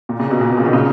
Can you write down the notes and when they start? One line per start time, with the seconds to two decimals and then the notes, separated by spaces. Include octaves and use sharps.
0.09 A#2
0.19 A#2 C#3
0.30 B2
0.41 A#2
0.49 B2
0.57 A#2 C#3
0.65 B2 D#3
0.73 A#2 C#3